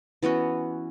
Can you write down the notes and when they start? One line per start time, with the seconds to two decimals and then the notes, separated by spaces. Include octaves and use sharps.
0.22 E3 B3 C#4 F#4